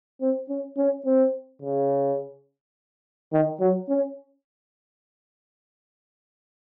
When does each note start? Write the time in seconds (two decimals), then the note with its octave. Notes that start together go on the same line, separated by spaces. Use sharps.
0.21 C4
0.49 C#4
0.78 C#4
1.05 C4
1.62 C#3
3.33 D#3
3.60 F#3
3.89 C#4